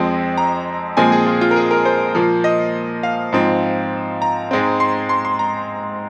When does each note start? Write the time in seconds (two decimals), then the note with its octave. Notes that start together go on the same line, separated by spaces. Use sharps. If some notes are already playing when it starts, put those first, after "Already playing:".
Already playing: F2 F3 G#3 C4
0.37 A#5
0.97 A#2 F3 G#3 C4 G#5
1.12 G#4
1.26 F4
1.41 F4
1.51 A#4
1.56 G#4
1.71 A#4
1.85 C5
2.15 A#2 F3 A#3
2.44 D#5
3.03 F5
3.33 G#2 F3 C4
4.22 A#5
4.51 G#2 G#3 C4
4.80 C6
5.09 C6
5.25 C6
5.39 A#5